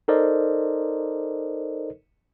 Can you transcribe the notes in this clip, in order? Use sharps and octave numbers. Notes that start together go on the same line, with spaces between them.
D#4 A4 A#4 C5 D5 D#5